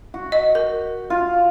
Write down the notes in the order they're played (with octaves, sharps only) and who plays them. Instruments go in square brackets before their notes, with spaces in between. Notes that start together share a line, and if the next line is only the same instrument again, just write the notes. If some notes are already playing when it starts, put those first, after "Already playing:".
[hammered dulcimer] F#4
[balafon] D#5
A#4
[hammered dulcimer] F4